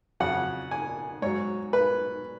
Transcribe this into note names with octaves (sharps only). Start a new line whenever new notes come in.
F2 C#3 F#3 F#5
G#5
G#2 F#3 C#5
B4